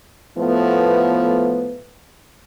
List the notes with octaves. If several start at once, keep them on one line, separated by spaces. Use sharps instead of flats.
A2 F3 A3 B3